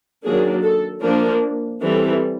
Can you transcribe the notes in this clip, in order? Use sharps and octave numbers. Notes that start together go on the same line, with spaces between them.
D#3 F#3 A#3 D4 G#4
A4
F3 A#3 D4 A#4
E3 G3 C4 A4